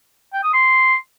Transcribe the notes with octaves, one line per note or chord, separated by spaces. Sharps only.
G5
D#6
C6